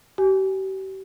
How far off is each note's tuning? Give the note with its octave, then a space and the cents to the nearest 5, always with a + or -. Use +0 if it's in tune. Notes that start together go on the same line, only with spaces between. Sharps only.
G4 -40 G#5 +0